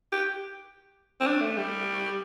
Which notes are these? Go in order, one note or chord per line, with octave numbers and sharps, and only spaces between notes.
G4
C4
D4
A3
G3